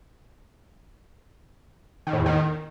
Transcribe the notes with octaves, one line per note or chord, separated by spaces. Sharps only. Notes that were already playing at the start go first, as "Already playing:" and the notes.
D#3
A2
E2
D#3